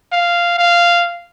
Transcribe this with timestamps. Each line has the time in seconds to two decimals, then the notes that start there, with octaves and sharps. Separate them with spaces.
0.12 F5
0.58 F5